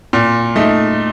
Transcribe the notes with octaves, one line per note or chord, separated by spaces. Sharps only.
A#2
A3 D#4